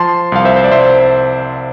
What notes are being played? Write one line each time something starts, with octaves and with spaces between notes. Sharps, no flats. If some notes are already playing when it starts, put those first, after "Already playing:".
Already playing: F3 A5 C6
C2 F5
C5 E5
C5
D5
C2 C5 E5